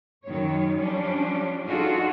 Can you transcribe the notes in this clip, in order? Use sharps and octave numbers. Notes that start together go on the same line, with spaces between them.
F#2 D#3 F#3 C#5
F3 G3 C#4 D4
D4 D#4 F4 F#4 G#4 A4